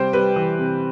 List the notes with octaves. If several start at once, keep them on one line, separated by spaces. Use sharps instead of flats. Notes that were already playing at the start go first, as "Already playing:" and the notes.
Already playing: C3 G3 C5 G5
G3 B4
E3
C3